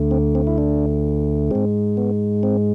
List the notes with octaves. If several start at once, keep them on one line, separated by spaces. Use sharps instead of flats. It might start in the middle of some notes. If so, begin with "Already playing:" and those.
Already playing: D2 D3 A3
C4
C4
E4
D4
G#2 G#3 C4
B3
C4